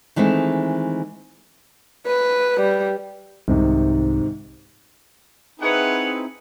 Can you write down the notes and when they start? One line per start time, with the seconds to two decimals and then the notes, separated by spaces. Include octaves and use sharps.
0.16 D#3 E3 G#3 A3 C4
2.07 B4
2.60 G3
3.48 C2 G#2 C3 D#3
5.60 C4 D#4 E4 G#4 B4 C#5 F#5